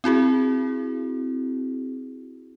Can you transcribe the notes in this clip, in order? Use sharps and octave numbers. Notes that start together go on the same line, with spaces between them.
C4 E4 F#4 G#4